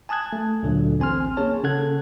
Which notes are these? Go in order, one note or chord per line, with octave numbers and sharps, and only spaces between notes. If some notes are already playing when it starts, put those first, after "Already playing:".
G#5 A5 D#6 F#6 G#6
A3
D2 A#2 D3 F#3
A1 C4 G#5 C6 F6
A#3 C#4 G#4 C#5 A5
C#3 C#4 A4 F#5 F#6 G#6